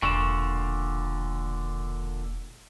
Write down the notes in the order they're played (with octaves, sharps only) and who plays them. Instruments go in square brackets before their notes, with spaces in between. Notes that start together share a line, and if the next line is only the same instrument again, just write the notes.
[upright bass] E1 [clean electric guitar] A#2 D3 [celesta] C#6 E7